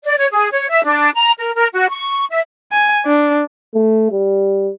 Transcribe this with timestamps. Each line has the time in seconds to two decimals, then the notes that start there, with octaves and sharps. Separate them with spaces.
0.04 D5
0.18 C#5
0.33 G#4
0.52 C#5
0.70 E5
0.85 D4
1.15 A#5
1.38 A#4
1.55 A#4
1.73 F#4
1.90 C#6
2.30 E5
2.72 G#5
3.06 D4
3.75 A3
4.12 G3